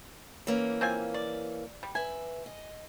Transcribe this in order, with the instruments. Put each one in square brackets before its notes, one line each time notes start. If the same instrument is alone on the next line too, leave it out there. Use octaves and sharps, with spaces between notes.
[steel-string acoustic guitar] E3 A#3 C#4
[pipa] C4 F4 G#5
D5
G3
[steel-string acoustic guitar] B4 E5 [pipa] G#5
[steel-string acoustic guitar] D#5